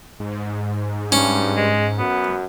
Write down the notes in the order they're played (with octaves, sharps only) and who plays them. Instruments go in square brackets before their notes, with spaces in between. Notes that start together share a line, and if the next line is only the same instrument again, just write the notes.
[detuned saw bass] G#2
[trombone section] G2 [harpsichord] C#4
[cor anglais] G#3
[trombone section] F#2 F#4 [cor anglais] B3